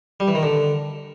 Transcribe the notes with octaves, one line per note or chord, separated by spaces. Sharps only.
G3
E3
D#3
D3